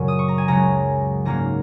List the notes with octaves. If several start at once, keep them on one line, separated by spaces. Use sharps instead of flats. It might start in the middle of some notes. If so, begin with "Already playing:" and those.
Already playing: F#2 A#2 C#3 F#3 C#4
D#6
C#6
A#5
G#5
C#2 C#3 F#3 C#4 A#5
G#2 F#3 A#3 C#4 A#5